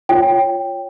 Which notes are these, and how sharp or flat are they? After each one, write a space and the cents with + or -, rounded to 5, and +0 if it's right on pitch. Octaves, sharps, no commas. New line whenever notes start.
F4 +0 C#5 +0 G5 +0